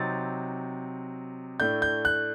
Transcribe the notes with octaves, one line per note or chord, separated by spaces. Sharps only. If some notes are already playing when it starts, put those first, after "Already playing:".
Already playing: C3 F#3 C4 D#4 A6
A2 A3 D4 G6
G6
F#6